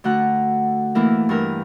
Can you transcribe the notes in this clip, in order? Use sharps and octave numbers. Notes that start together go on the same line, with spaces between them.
D3 A3 F#4 F#5 A#5 F#6
E3 A3 A#3 E4 A#4
G2 E3 A#4 E5 G6